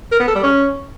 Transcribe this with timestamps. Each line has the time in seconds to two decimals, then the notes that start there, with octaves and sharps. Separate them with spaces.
0.12 A#4
0.20 B3
0.28 A4
0.35 G3
0.43 C#4